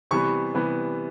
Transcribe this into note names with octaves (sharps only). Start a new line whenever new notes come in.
C3 E3 G3 B3 C#6
C3 E3 G3 B3